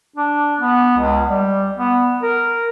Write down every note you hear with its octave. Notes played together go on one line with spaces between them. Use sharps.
D4
B3
C#2
G3
B3
A#4